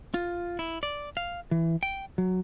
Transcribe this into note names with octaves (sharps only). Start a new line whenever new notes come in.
F4
E4
D5
F5
E3
G5
F#3